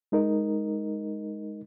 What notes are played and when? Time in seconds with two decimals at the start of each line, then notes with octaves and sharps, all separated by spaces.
0.12 G#3 D#4 A#4 D#5